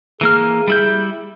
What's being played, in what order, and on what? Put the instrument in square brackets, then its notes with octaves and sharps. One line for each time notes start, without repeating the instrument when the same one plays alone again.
[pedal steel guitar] E3 A#3 F6 [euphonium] G#4
[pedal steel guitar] G3 E4 G6